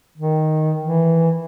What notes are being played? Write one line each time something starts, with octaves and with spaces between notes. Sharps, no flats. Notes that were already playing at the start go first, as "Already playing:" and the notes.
D#3
E3